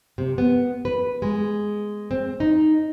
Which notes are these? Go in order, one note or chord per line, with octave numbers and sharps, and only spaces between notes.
C3
B3
B4
G#3
C4
D#4